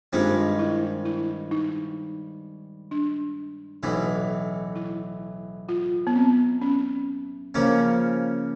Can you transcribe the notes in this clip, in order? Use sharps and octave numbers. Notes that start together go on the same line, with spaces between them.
G2 D#3 G#3 C4 F4
E4
E4
D#4
D4
B1 A2 E3 D#4
E4
F4
B3
C4
C#4
C#3 F3 A#3 C#4